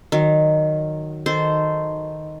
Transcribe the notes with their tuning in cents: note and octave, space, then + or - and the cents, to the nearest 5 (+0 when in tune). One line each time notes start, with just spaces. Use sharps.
D#3 -15 F#3 +0
D#3 +0 A4 +0 C5 -10